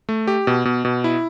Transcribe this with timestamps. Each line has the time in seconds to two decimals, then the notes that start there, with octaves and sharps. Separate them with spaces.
0.09 A3
0.27 G4
0.47 B2
0.65 B2
0.85 B2
1.04 E4